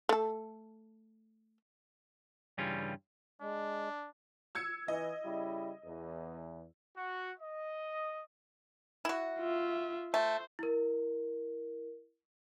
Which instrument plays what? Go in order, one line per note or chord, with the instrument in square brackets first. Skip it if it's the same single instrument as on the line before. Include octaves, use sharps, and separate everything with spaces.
[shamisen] A3 A4
[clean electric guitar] G2 C#3 E3 G3 C#4 F4
[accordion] G#3 [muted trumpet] D4
[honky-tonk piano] E6 G#6 C#7
[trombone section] E3 [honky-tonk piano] D#5
[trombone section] C#3 G3 E4
E2
[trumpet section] F#4
D#5
[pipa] E4 F#4
[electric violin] F4 E5
[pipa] A3 [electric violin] C5
[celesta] E4 A#4